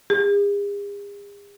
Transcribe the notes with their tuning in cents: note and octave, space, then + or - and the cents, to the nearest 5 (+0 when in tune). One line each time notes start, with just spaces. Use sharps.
G#4 -45